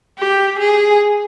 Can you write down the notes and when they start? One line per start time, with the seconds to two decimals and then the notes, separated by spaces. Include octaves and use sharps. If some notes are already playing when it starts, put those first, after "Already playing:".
0.18 G4
0.59 G#4